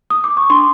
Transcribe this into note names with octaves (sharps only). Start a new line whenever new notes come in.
D#6
D6
C#6
D4 C6